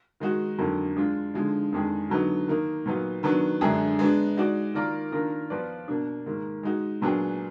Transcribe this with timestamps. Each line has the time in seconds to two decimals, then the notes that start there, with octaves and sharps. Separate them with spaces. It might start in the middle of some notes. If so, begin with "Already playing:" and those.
0.20 D#3 G#3 D#4 F#4
0.59 F2 D3 F#3 A#3 D#4
0.97 G#3 D4 F4
1.34 D3 F3 G#3 D#4
1.73 F2 D#3 G#3 D4 G#4
2.10 D3 F#3 B3 D#4
2.48 D#3 A#3 D#4
2.86 A#2 F#3 B3 D#4
3.23 D#3 F#3 B3 D4
3.61 F#2 D3 G#3 D4 G#4
3.99 G#3 B3 D4
4.37 G#3 D#4 F#4 D5
4.74 D#3 A#3 F4 A#4 D5
5.12 D#3 A#3 D4 F4 A#4
5.50 F3 B3 F4 B4 D5
5.88 B2 A#3 D4
6.26 G#2 D#3 A#3
6.63 G#3 D#4 F#4
7.02 A#2 F#3 B3 D4 G#4